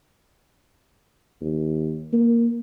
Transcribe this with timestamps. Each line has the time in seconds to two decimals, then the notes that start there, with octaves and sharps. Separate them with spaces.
1.41 D#2
2.13 A#3